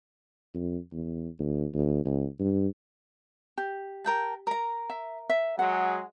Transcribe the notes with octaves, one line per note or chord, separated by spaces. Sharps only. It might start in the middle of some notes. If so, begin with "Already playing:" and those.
F2
E2
D2
D2
C#2
G2
G4
A#4 G5 A5
A#4 A#5
E5
E5
F#3 G#3 G#4 F#5